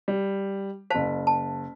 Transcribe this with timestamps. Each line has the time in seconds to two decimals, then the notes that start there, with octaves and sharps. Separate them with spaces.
0.08 G3
0.90 F#1 C5 F5 A5 B6
1.27 A5